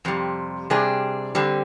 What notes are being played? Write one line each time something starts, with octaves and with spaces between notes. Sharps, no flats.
F2 C3 G3
C3 G3 D4 G#4
D3 G3 C4